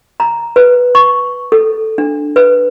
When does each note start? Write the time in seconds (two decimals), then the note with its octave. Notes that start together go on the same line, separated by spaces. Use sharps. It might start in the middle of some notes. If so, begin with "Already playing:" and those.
0.20 A#5
0.56 B4
0.95 C#6
1.52 A4
1.98 D4
2.36 B4